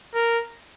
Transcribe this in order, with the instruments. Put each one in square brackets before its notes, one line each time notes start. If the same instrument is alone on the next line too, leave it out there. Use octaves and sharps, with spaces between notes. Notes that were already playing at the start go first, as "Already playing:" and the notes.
[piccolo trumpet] A#4